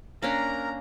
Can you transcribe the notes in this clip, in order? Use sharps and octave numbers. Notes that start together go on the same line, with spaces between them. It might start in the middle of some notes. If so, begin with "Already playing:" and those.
A#3 C#4 D4 A#4 A#5